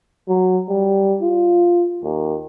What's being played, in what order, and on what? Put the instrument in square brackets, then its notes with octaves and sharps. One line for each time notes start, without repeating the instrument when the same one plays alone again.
[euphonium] F#3
G3
F4
D#2